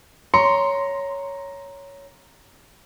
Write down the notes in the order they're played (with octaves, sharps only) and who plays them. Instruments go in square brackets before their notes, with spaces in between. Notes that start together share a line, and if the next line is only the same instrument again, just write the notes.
[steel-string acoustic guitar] C#5 [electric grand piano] A#5 C#7 [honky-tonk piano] C6